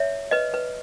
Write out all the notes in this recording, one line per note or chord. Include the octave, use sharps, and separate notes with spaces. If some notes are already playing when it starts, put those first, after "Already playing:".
Already playing: C#5 E5
B4 D#5
B4